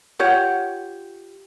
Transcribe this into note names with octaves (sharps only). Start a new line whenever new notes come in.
F4 G4 C#5 F#5